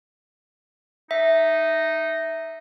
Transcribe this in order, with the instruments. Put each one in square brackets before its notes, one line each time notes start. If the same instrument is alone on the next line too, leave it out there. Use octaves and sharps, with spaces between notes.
[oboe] D#4 [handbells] E5